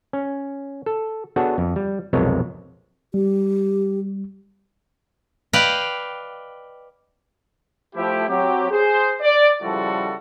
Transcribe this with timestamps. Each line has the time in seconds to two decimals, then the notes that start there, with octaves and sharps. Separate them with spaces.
0.13 C#4
0.86 A4
1.36 B3 D4 F#4 G#4 A4 C#5
1.58 F2
1.76 G3
2.13 B1 F2 C3 G#3 A#4 C#5
3.14 G3 G4
5.53 B4 D5 D#5 F5 G5
7.96 F3 A3 E4 G4
8.28 F#3 C4 G4
8.72 G#4 C5
9.21 D5
9.62 C#3 F3 G3 E4 F#4 A4